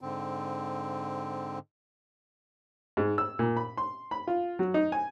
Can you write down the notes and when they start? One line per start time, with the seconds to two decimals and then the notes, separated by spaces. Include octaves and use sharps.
0.01 G#2 D3 C4
2.97 G#2
3.18 E6
3.39 A#2
3.57 B5
3.77 C6
4.11 B5
4.27 F4
4.59 F#3
4.74 D#4
4.92 G#5